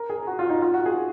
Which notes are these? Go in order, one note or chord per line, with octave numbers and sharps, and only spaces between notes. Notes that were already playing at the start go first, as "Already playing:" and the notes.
Already playing: A#4
G#4
F#4
F4
D#4
F4
F#4
G#4